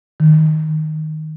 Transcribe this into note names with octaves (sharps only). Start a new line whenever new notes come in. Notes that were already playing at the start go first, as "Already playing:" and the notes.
D#3